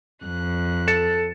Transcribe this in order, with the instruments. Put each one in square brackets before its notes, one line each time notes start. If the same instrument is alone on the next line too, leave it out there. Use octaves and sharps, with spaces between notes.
[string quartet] F2 F#6
[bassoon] A4 [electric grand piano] A6 C#7 E7